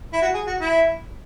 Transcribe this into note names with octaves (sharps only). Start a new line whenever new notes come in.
E4
F#4
G#4
F#4
E4